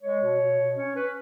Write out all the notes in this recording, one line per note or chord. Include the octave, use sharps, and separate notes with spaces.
G#3 C#5
B2
B2
B2
C#4 C#5
C#4 B4